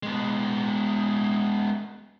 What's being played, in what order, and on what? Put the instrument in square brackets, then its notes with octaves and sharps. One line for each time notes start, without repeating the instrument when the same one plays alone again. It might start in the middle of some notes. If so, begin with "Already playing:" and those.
[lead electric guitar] G#3 B3